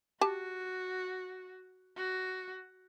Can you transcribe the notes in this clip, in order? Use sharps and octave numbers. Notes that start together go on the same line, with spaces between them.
F#4 G4 A5
F#4